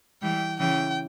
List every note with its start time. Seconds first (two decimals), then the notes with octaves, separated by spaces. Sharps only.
0.22 E3 G3 G5
0.60 C#3 E3 G5